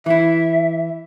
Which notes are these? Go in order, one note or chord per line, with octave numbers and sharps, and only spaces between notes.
E3 E4 E5